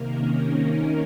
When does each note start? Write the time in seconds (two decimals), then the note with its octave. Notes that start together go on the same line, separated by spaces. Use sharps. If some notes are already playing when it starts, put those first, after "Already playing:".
Already playing: C3 D#3 A#3 A#4
0.09 C#4
0.37 D#4
0.65 D#4